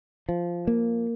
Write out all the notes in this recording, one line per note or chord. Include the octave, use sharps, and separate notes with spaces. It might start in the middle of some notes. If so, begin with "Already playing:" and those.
F3
A#3